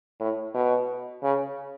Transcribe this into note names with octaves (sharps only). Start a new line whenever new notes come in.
A2
B2
C#3